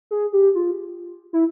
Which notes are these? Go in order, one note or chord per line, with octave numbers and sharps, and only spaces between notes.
G#4
G4
F4
E4